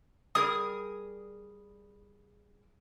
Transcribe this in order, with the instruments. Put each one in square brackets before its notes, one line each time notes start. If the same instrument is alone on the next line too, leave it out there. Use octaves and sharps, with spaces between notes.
[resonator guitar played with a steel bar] G3 G#4 A#4 [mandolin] D#6